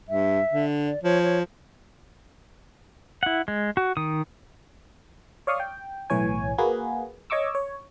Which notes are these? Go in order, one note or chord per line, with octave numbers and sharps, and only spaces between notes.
G2 E5
D3
D5
F3 C#5
C#5
E4 F#5
G#3
F#4
D#3 D#6
C#5 D5 F5 C#6 D#6 F6
G5
B1 A2 E3 C#5 G#5
A#3 F#4 G#4 B4
C#5 D#5 C#6 D6 E6
C#5